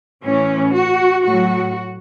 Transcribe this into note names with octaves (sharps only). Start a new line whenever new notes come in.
A2 E3 C#4
F#4
A2 F#3 F#4